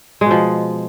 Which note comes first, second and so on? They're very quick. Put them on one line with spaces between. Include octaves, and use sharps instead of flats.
G#3 B2 F3